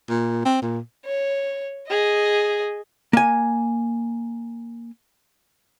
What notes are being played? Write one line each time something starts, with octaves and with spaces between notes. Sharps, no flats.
A#2
C4
A#2
C#5
G#4 D#5
A#3 G#5